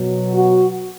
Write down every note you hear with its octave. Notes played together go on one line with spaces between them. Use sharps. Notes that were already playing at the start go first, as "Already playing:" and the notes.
Already playing: B2 F#3
F#4